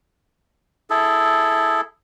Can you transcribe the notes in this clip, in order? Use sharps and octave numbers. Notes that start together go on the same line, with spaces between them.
E4 G#4 A4